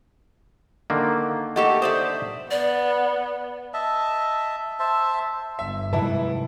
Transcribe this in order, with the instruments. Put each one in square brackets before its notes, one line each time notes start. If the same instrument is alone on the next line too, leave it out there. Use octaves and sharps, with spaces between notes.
[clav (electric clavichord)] D3 D#3 A#3
[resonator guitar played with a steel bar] A3 G4 A4 [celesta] D#5 F#5 C#6
[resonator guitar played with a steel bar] C5 D5 E5 [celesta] D#6
[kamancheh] B3 [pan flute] D5
[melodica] D#5 E5 A5
C5 E5 A5
[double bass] G1 [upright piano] E5
[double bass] G#2 [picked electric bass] C3 D#3 G3 [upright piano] E4 A5 [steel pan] B4 E5